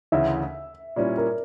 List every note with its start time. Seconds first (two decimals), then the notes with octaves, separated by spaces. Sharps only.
0.12 D2 C#3 E3 E5
0.96 A#2 G3 C#4 E4 D5
1.17 A#4